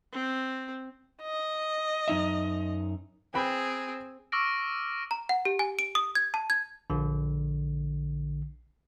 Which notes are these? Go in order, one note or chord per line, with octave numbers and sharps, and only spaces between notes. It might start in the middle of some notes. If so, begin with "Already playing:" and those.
C4
D#5
F#2 D#4 E5
C4 G#4 B4 G5 B5
C#6 D6 E6 F6 A#6 D7
A#5
F#5
G4
G#5
D7
D#6
G#6
A5
G#6
A#1 D3